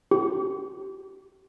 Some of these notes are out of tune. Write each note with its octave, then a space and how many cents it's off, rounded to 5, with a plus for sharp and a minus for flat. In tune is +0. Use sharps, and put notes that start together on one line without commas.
G4 -35